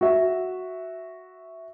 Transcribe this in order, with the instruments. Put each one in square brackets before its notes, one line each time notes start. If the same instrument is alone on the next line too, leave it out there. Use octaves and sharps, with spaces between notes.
[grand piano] F#4 E5